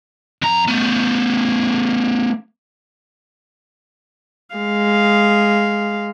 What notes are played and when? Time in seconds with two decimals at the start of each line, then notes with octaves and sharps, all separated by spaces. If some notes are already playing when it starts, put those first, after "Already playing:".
0.42 F2 A#5
0.68 A3 B3
4.56 G#3 F5